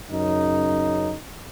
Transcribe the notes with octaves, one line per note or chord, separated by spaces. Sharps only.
F#2 C#3 D#4